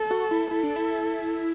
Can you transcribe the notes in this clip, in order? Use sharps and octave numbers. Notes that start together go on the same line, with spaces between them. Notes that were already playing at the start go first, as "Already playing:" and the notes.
Already playing: A4
F#4
E4
E4 A4
D4
E4